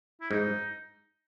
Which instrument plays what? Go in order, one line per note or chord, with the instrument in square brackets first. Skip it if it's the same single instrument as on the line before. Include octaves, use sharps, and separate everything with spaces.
[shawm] E4
[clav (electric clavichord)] G#2 [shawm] D#4